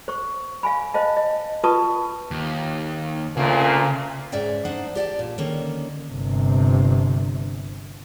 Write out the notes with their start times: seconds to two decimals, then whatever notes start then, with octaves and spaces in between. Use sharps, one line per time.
0.08 C5 C#6
0.63 F5 G#5 B5
0.94 C5 D#5 F5 A5
1.17 D#5
1.64 F4 B4 A5 C#6 D#6
2.31 D#2
3.37 D2 A#2 C#3
4.32 G#2 C#4 D5 E5 G5
4.65 A3 D4 D#4 C5 D5 F#5
4.95 G4 D5 G5 A5
5.19 A#2
5.38 D3 D#3 A#3 C#4
6.10 G1 C3